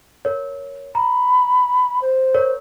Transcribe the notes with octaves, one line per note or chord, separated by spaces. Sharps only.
A#4 C#5
A#5 B5
C5
A#4 C#5